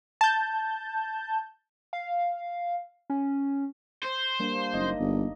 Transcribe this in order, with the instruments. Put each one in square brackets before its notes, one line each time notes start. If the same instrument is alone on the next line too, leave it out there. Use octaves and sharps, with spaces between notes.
[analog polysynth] A5 G6
[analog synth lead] F5
C#4
[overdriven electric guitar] C5
[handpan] G3 A#3 D4
[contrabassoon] F#1 [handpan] D#4 D#5
[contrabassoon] G1